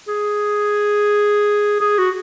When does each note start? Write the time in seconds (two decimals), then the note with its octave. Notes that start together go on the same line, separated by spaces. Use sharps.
0.08 G#4
1.81 G#4
1.98 F#4